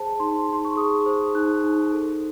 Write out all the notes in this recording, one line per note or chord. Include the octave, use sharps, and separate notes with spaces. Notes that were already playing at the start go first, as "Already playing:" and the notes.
Already playing: G#4 C5 A5
D#4 C6
D#4 C6
C#6
G#4 D#6
C5
D#4 F#6
D#4
A4